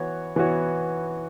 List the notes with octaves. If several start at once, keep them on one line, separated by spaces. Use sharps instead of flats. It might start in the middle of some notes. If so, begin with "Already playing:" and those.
Already playing: E3 B3 F#4 C#5
E3 B3 F#4 C#5